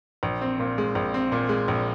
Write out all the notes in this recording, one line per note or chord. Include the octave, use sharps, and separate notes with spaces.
A#1
C4
A#2
G#3
A#1
C4
A#2
G#3
A#1